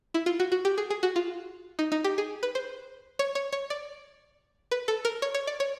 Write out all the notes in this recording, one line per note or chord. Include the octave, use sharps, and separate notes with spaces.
E4
F4
F#4
F#4
G4
G#4
G#4
F#4
F4
D#4
D#4
G4
G#4
B4
C5
C#5
C#5
C#5
D5
B4
A4
A#4
C#5
C#5
D5
C#5